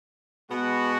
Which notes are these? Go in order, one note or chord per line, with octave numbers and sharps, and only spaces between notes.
B2 G#3 B3 F#4